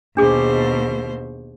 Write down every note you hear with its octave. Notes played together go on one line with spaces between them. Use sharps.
D#2 B2 D4 G#4 C5 D6